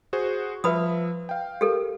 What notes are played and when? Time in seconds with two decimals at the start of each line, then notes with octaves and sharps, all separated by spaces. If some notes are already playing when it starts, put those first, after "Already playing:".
0.13 F#4 G#4 C5
0.64 F3 B4 E5 B5 D#6
1.29 F5 G5
1.61 G4 A4 A#4